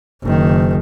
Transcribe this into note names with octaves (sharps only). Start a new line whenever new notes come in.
F#1 D#3